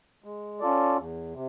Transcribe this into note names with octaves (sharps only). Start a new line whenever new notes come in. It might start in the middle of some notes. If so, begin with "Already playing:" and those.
G#3
C#4 F4 A4 D5
E2
C3